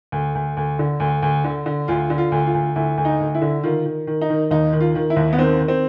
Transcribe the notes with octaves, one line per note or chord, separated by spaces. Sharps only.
D2
D2
D2
D3
D2
D2
D3
D3
D2 F4
D3
F4
D2
F4
D2
D2 E4
D2
D#4
D2
E4
D3
D#3 F4
D#3
D#3
D#4
D#3
D#2 D#4
D#3
F4
D#3
E4
D#2
B3
D#3 C4
D#3
C4